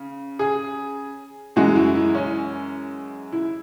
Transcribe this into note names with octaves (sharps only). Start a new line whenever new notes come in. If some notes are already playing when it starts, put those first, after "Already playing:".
Already playing: C#3
G#4
F#2 E3 G#3 F#4
E4
E4
C#4
E4